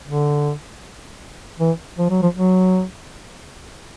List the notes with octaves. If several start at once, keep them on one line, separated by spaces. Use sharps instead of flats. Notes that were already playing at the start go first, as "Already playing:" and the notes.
D3
E3
F3
F#3
F3
F#3